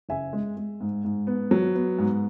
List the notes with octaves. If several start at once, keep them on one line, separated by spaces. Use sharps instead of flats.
F#1 E5 G#5
G#3
G#3
G#2
G#2
B3
F#3
B3
G#2